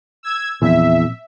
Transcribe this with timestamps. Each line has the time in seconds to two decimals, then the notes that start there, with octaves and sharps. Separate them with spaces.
0.23 E6 G#6
0.62 E2 A#2 F3 C4 E5